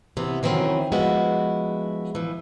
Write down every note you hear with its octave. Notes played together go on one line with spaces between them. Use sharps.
C3 E3 B3
D#3 E3 F#3 C4 C#4
F3 G#3 B3 E4 F#4
E3 F3